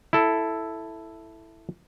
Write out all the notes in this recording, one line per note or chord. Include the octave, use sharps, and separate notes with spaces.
E4 A4